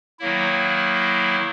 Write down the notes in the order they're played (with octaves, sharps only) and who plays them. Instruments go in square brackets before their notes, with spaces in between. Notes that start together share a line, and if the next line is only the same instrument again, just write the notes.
[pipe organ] D#3 F#3 A#3 E4